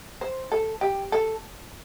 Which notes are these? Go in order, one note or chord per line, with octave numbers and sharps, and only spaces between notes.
C5
A4
G4
A4